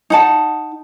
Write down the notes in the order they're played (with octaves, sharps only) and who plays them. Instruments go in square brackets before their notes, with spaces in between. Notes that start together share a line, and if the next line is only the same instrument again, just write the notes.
[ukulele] D#4 F#5 A5